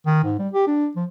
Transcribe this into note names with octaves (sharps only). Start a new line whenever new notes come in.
D#3
G#2
G3
G4
D4
F3